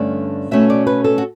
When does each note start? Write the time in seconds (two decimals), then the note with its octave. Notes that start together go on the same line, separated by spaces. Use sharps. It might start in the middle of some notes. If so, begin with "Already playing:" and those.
Already playing: G2 D3 A3 C#4 D5
0.51 B2 A3 C#4 E5
0.70 D5
0.87 B4
1.04 A4
1.18 F#4